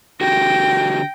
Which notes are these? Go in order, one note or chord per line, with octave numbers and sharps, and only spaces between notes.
D3 F#4 G4 G5 A#6